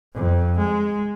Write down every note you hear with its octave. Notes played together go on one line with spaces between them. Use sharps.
F2
G#3